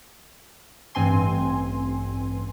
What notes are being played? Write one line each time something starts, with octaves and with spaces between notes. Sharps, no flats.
A1 G2 C4 G#5 C6